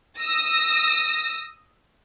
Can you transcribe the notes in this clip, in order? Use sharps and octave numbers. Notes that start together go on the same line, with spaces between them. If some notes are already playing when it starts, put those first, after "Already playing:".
D#6 E6 A#6